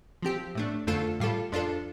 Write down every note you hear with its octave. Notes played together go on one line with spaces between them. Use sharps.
F3 C4 G4
A2 A3 D4
F2 D3 A3 F4 A4
A2 G3 F4 A4
F2 F3 D4 F4 A4